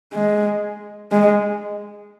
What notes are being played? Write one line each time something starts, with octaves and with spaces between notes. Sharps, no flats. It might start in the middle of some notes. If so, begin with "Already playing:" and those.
G#3
G#3